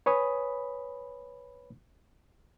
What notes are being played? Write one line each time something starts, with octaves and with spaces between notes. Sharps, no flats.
B4 C#5 G#5 B5 D#6